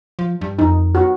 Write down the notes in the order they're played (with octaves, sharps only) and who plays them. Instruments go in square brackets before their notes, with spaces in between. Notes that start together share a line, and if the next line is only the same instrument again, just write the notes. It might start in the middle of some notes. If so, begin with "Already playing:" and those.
[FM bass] F3
G2
[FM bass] F2 [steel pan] D#4
[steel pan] F#4